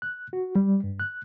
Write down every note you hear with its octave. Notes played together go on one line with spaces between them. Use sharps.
F#6
F#4
G3
G2
F#6